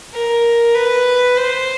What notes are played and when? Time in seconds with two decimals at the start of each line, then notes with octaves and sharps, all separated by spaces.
0.13 A#4
0.75 B4
1.37 C5